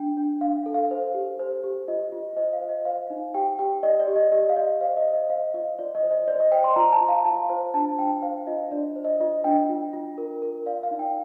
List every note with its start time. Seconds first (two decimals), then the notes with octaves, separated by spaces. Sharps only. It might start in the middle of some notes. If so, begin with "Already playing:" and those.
Already playing: D4 G5
0.17 D4
0.41 D4 F5
0.66 A4
0.74 F5
0.91 C5
1.14 G4
1.39 C5
1.64 G4
1.88 F4 D#5
2.12 F4
2.37 C5 D#5
2.53 F5
2.61 C5
2.69 D#5
2.85 C5 F5
3.10 D#4
3.34 G4 G5
3.59 G4 G5
3.83 D5 D#5
3.99 D5
4.08 G4
4.16 D#5
4.32 G4 D#5
4.49 F5
4.56 D5 D#5
4.81 C5 F5
4.97 D#5
5.05 C5
5.14 D#5
5.30 C5 F5
5.54 F4 D#5
5.79 F4 D5
5.95 D#5
6.03 C5
6.11 D#5
6.28 C5 D5
6.40 D#5
6.52 C5 G5
6.64 C6
6.76 F4 A#5
6.92 A5
7.01 F4
7.09 F5
7.25 F4 A5
7.50 C5
7.74 D4 A5
7.99 D4 G5
8.22 C5 F5
8.47 F4 D#5
8.71 D4 D5
8.96 C5
9.04 D#5
9.20 F4 D#5
9.44 D4 G5
9.69 F4
9.93 F4
10.18 A#4
10.42 A#4
10.66 D5 F5
10.83 F5
10.91 D#4
10.99 G5